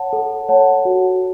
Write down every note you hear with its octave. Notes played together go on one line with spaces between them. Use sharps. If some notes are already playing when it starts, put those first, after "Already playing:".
Already playing: C#5 F#5 A5
A4
C#5 F#5 A5
F#4